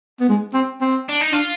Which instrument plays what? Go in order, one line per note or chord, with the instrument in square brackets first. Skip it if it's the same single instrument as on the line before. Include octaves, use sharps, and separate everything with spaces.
[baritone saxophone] B3
G#3
C4
C4
[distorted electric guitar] D4
D#4
[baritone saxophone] D4 [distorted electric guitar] F4